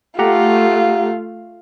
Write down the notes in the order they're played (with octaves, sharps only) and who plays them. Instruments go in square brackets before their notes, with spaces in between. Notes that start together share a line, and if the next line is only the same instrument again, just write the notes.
[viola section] A3 [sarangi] F4 [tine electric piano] G4 F#5 A#5